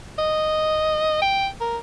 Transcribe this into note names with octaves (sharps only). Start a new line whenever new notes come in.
D#5
G5
A#4